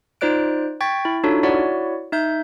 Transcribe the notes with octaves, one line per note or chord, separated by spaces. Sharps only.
D#4 F4 C5 D5 F#6 D7
G5 C#6 G#6 A6 B6
E4
D4 D#4 F4 F#4 A4 C#5
E4 F#4 C#5 D5 F#5
D#4 E5 G6